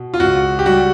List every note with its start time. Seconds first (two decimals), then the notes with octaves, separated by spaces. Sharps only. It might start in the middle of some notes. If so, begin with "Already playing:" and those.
Already playing: B2
0.14 F4
0.20 C#2 F#4
0.59 G4
0.66 G3 F#4